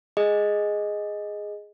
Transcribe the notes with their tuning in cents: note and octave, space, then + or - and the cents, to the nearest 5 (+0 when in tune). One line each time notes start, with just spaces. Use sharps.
G#4 +0 D#5 +0